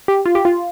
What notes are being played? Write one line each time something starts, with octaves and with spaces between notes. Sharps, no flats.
G4
F4
G4
F4